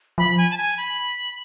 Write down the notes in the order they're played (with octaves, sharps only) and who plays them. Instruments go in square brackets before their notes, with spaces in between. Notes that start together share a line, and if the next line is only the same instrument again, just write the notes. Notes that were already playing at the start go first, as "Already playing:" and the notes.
[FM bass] F3 [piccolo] B5
[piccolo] G#5
A5
G#5
B5